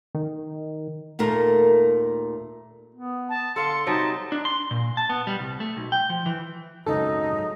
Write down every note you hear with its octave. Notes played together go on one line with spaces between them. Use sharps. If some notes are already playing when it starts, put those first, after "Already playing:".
D#3
D#2 A#2 A3 A#4
B3
A5
D3 A4 F5 C6 C#7
C3 F#3 G3 D#4 A5
D4
C6
A#2
A5
B3
G3
C2
A3
B1
G5
F3
E3
G#1 C#2 F#2 F#3 G#3 D#4 A4